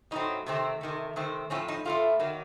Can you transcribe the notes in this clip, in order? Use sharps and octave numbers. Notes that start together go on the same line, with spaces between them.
A2 F#3 C4 D#4
C3 D#3 A3 C4
C3 D#3 A3
C3 D#3 A3 C4
A2 F3 A3 C4 C#4
D#4
A2 A3 C4 F4
D#3 F#3 A#3